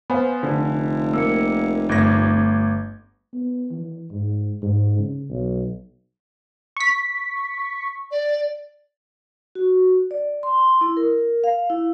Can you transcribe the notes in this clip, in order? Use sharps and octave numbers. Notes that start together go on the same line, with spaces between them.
B3 C5 F5 G#5 B5
F1 D3
A#3 E6 C#7
G1 A3 D6 G#6 A#6
B3
E3
G#2
G#2
C#3
B1
C#6 B6
D5
F#4
D5
C6
E4
A#4
F5
E4